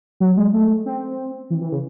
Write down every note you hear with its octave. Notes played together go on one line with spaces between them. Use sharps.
F#3
G#3
A3
C4
E3
E3
C#3